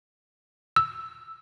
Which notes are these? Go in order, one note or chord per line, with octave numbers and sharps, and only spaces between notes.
E6